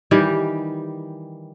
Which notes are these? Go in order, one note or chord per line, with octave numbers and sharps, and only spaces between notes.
D#3 E3 G3 G4